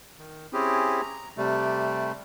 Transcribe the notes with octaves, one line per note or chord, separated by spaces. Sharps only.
D#3
C4 C#4 E4 G4 G#4
A#5
C3 G3 A3